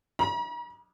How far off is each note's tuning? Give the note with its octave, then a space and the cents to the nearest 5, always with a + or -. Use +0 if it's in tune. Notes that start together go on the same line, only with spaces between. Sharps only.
A#5 +45